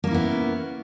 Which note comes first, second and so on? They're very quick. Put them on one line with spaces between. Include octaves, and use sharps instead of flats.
A#3 C#4 E4 B3